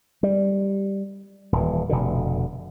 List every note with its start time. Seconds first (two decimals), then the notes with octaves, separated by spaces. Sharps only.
0.23 G3
1.52 D#1 E3
1.89 F1 B2 D3